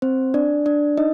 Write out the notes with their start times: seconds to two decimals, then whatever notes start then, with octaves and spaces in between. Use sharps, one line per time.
0.02 C4 C5
0.34 D4 D5
0.66 D4 D5
0.98 D#4 D#5